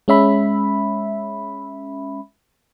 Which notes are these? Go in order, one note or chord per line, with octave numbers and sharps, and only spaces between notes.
G#3 C#4 E5 B5